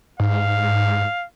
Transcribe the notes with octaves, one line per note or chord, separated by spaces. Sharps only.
G#2 F5